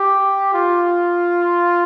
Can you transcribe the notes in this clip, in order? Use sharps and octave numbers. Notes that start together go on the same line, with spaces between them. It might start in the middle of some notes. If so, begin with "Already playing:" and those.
Already playing: G4
F4